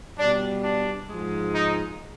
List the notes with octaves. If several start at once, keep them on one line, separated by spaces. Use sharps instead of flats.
B2 G3 D4
D4
G#2 F3 G#3
D#4